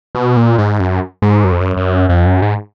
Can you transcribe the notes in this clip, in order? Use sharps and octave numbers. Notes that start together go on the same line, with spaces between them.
B2
A#2
G#2
F#2
G#2
F#2
F2
F#2
F#2
F2
F#2
G#2